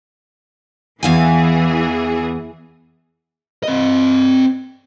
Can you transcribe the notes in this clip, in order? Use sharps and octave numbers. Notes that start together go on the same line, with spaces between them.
E2 E3 G#4 F5 G#5
C4 D#5